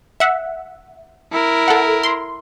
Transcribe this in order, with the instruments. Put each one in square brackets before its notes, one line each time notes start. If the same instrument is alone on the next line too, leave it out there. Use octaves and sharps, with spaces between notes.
[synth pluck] E5 F#5
[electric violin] E4 A#4
[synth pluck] A4 F#5
C6